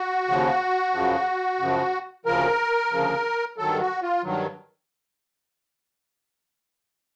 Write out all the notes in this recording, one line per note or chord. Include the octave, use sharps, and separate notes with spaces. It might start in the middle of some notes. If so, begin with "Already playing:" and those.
Already playing: F#4
D#2 C#3 F3
F#2 C#3 F3
F#2 C#3 F3
D2 C#3 F3 A#4
D2 C#3 F3
G2 D#3 F#3 A4
F#4
F4
G2 D#3 F#3